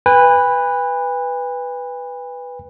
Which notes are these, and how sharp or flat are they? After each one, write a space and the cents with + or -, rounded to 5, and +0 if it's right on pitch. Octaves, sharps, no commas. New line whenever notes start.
B4 +0 G#5 -45